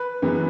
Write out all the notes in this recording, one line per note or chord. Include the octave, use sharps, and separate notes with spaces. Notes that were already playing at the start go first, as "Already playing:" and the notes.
Already playing: B4
F#2 E3 G#3 B3